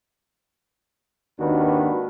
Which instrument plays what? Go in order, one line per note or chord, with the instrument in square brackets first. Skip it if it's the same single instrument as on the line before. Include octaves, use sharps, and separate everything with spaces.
[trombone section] G#1 D#2 D#3 D4 F#4 B4